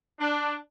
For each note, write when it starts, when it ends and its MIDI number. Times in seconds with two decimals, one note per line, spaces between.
0.20 0.54 62